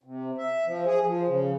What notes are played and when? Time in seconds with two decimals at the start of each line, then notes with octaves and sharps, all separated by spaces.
0.03 C3
0.38 E5
0.66 F3
0.86 G#4
1.05 F3
1.28 C#3